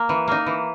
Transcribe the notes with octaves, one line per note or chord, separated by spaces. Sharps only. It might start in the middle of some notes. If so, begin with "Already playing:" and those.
Already playing: A#3
E3
A#3 D#4
E3